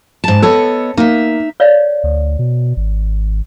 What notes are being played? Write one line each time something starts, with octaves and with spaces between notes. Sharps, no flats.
G#2 A5
B3 A4 C#5 D#5
A#3 D#4 E5
C#5 D5 F5
D2
B2
G#1